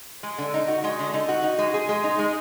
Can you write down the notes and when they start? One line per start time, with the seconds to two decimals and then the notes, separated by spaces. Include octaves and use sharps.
0.23 G#3
0.38 D3
0.54 D#4
0.68 F#4
0.84 G#3
0.99 D3
1.14 D#4
1.29 F#4
1.43 D#4
1.59 G#3
1.74 G#4
1.89 G#3
2.04 D#4
2.19 G#3